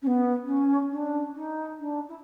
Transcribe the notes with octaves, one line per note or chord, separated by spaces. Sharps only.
C#4
B3
C#4
D4
D#4
D4
E4